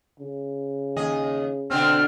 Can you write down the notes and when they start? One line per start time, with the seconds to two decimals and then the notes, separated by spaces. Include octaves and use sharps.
0.20 C#3
0.96 D#2 G#4 D#5
1.70 B2 D3 C4 D4 F6